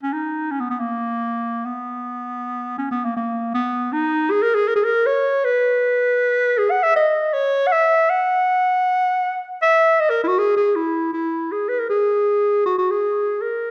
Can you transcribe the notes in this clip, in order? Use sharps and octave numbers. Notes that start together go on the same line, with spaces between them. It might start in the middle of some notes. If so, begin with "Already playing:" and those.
C#4
D#4
C#4
B3
B3
A#3
B3
C#4
B3
A#3
A#3
B3
D#4
G#4
A#4
G#4
A#4
G#4
A#4
C#5
B4
G#4
F#5
E5
D#5
C#5
F#5
E5
F#5
E5
D#5
A#4
E4
F#4
G#4
G#4
E4
E4
G#4
B4
A#4
G#4
F#4
F#4
G#4
A#4